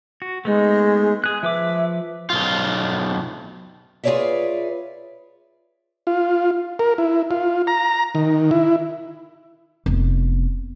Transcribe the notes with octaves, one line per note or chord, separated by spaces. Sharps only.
F#4
G#3 A3 B3 D#4
G#4 F#6
F3 B4 E5 D6
B1 F4
F4 G#4 B4 C#5 D5 E5
F4
A#4
E4
F4
A#5
D#3
E4
F1 B3